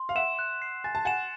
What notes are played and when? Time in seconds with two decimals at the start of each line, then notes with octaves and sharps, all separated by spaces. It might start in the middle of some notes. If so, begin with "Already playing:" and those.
Already playing: C6
0.09 F5
0.15 E5 F#5 E7
0.39 F#6
0.62 C7
0.84 G#5 A6
0.95 A5
1.05 F#5 G#5 E7